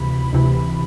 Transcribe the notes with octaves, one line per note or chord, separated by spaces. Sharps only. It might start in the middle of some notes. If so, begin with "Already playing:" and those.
Already playing: D2 C3 E3 B5
D2 C3 E3